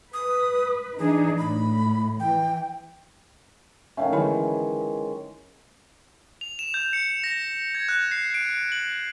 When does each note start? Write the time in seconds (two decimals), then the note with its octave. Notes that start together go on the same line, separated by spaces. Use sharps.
0.14 B4 D#6
0.99 E3 D4 D#4 G#4
1.38 A2 B5
2.20 E3 G5
3.97 D#3 A3 C#4 E5 F5 G5
4.12 D3 E3 F#3 G#3 B5
6.41 F7
6.59 E7
6.74 G6
6.93 C#7
7.24 A#6
7.75 G#6
7.89 F#6
8.11 C7
8.34 D7
8.72 F#7